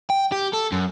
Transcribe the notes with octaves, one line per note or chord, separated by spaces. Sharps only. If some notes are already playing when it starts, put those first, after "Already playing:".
G5
G4
A4
F#2